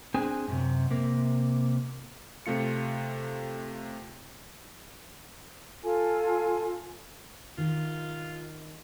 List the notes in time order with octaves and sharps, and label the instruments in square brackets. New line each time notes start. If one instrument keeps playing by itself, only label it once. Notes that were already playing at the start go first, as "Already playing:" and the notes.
[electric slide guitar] C4 D4 G#4 G#5
F#2 A2 C3
C3 A#3
[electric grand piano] C3 A3 F4 C#7
[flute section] F4 A4 G#5
[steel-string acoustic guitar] D#3 [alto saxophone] F4